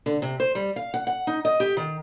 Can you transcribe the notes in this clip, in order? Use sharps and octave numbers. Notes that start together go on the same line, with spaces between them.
D3
C3
C5
G3
F5
F#5
F#5
D#4
D#5
G4
D#3